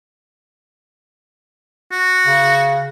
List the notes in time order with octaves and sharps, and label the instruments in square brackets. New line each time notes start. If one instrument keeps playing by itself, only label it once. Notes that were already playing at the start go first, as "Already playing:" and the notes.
[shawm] F#4
[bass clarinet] C#3